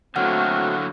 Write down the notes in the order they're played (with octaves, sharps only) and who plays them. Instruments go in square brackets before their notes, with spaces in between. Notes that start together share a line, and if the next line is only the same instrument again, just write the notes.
[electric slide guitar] D3 F#3 A#3 [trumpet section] A3 C4 F#4 [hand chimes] F#5 F6